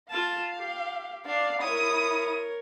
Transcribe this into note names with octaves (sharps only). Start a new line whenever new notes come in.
F4 F5 A5
G4
D4 D5 F5
E4 A#4 C#5 D#6